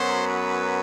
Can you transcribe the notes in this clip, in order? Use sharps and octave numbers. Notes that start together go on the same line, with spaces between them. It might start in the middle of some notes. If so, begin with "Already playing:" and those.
Already playing: F#2 F#3 B3 C5
B4